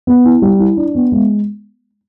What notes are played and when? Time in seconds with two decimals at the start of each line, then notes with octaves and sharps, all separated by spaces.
0.07 B3
0.25 E4
0.42 G3
0.59 E4
0.77 D4
0.95 B3
1.12 G#3